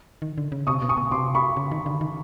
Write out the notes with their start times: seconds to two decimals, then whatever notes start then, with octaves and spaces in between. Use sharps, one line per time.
0.22 D#3
0.38 D3
0.52 C#3
0.67 C3 C#6 D#6
0.82 B2
0.89 C#6 D#6
0.97 B2
1.11 C3 C6 D6
1.35 B5 C#6
1.57 C#3
1.71 D#3
1.86 D3
2.01 D#3